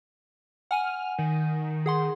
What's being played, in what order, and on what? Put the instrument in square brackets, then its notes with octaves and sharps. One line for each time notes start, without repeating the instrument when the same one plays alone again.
[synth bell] F#5 G#5 D#7 [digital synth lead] F6
[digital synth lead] D#3
[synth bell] G#4 F#5 C6